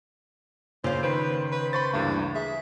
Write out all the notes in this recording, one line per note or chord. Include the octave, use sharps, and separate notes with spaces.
A#2 C#3 C5 F5
D#3 B4 C5 D7
B4
C5 B5 C#6 A6
D2 G2 E3 A#3
G#4 E5